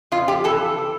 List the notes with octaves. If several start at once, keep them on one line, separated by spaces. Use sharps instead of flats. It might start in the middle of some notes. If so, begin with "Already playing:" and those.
F2 F4
G4
E3 A4